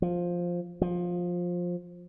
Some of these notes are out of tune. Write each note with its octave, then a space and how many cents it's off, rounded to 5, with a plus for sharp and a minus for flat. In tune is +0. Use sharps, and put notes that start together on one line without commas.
F3 +5
F3 +15